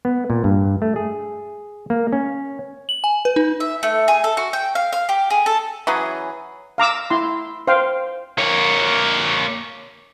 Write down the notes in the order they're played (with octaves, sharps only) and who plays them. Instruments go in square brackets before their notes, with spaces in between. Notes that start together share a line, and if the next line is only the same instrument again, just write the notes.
[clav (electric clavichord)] B3
A#2
G2
A3
G#4
A#3
C#4
[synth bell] F#7
G#5
B4
D#4
[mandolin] E5
A3
G#4
A4
F#4
G5
F5
F5
G4
G#4
A4
[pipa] E3 F#3 C#4 G#4
[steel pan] F5 A#5 D6 E6
E4 C6
C5 F5 G5
[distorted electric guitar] A#3 C#5